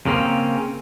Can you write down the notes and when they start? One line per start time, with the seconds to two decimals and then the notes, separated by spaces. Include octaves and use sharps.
0.06 C#3 A#3 C4 C#4